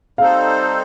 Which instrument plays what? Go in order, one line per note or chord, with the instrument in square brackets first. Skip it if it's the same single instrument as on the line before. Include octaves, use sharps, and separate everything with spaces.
[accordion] G3 C4 D#4 A4 C5 [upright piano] F5